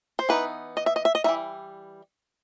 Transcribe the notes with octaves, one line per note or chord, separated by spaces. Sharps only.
C5
E3 B3 D#4 B4
D#5
E5
D#5
E5
D#5
E3 G3 D#4 E5